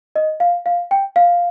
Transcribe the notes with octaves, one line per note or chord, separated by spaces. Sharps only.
D#5
F5
F5
G5
F5